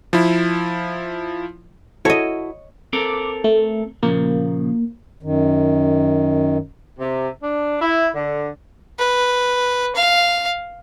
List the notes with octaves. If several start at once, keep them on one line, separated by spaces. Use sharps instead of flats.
F3 E4
E4 F#4 A4 C#5 D#5
C4 A4 A#4 D6
A3
A#2 C#3 F3 A#3
F#2 D#3
C3
D4
E4
D3
B4
F5